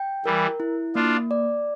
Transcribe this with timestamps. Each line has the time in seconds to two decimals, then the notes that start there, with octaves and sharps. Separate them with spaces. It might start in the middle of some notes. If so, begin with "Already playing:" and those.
Already playing: G5
0.25 E3 G3 A#4
0.60 E4
0.95 A#3 D4 F4
1.31 D5